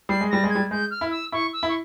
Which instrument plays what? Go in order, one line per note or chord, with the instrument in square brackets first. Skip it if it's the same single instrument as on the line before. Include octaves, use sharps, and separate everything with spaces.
[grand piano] G3 [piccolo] C7
[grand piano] G#3
[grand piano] G3 [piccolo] A#6
[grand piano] G#3
[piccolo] G#6
[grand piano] G3
[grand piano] G#3 [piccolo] G6
[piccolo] F6
[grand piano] E4
[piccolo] E6
[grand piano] E4 [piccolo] C#6
[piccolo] E6
[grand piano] E4
[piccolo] C#6